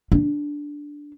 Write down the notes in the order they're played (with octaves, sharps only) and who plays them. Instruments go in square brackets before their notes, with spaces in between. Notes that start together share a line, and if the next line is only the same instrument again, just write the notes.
[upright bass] D4